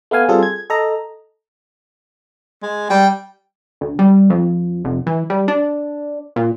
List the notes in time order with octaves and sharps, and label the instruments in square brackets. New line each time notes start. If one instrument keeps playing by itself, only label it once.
[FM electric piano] A3 B3 F5 G#5
G3 C4 F4 G#4 A4
G#6
A4 D#5 A#5
[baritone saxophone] G#3
[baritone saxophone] G3 [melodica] G5
[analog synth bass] D2
G3
F2
F1
E3
G3
D4
A#2